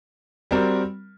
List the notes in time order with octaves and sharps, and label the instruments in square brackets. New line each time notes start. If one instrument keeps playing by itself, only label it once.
[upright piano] G3 C4 F#4 A#4